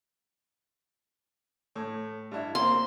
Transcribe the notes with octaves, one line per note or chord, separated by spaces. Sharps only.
A2
G2 E4
A#3 C4 C6